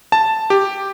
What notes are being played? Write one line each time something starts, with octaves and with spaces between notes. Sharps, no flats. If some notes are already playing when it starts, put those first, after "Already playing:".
A5
G4